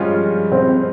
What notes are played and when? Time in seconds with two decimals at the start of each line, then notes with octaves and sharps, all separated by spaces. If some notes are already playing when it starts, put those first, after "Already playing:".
Already playing: G2 F3 G#3 C#4 F4
0.52 C4